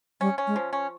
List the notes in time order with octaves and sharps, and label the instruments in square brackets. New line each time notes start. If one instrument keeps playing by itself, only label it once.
[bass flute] G3 [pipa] C#4
[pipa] C#4
[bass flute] G#3
[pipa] F3
C#4